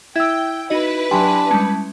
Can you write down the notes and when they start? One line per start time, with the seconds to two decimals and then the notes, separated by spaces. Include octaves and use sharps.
0.16 E4 E5 G5 E6 G#6
0.70 D#4 E4 F#4 B4 D#5
1.11 F#3 D4 G4 G5 G#5 C6
1.51 G3 G#3 C#4 A5